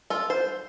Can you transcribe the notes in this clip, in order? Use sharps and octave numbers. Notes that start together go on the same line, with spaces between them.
F4 A4
C5